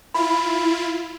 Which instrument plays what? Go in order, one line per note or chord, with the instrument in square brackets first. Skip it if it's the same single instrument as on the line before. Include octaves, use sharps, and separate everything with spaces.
[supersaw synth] E4 F4 [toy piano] B5